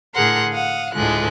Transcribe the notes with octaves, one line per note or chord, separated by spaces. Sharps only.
A2 D3 G#4 A#4 F#5 C6
F5 F#5 D#6
D2 A2 D3 G#3 F4 F#6